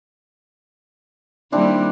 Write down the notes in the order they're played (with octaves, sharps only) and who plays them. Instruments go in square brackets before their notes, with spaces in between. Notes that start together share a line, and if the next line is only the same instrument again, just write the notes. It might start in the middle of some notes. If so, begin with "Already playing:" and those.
[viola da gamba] D#3 G3 A#3 [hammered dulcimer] C4 D4 E4